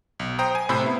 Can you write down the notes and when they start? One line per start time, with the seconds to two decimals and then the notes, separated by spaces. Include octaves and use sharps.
0.19 B1
0.39 C5 G5 A#5 D#6
0.55 G#5
0.69 A2 C3 C5 B5 E6
0.84 B3 E4